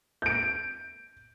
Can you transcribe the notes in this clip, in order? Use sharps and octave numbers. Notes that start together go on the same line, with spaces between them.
G6 D7